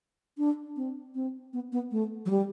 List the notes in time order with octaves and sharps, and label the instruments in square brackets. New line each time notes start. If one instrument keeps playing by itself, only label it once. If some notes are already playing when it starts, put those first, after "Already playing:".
[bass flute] D4
C4
C4
B3
B3
A3
F#3
G3